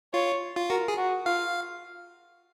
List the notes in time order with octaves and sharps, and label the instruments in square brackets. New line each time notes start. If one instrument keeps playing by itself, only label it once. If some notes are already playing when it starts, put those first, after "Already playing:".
[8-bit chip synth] F4 [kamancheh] C#5
[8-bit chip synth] F4
[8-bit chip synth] F#4 [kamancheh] A#4
[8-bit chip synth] G#4
[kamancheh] F#4
[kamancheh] F4 [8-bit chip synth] F5